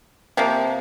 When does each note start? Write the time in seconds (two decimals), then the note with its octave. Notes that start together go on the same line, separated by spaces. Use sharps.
0.37 C3 F3 A#3